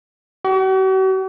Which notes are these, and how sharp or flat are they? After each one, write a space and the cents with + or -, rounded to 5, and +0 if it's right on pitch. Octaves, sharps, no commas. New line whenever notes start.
F#4 +45